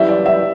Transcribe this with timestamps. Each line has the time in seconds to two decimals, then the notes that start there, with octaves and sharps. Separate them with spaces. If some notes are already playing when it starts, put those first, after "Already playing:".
Already playing: F#2 E3 G3 E5
0.09 D5
0.26 E5